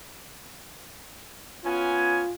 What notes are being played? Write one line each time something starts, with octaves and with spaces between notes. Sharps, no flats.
B3 C#4 F4 G#5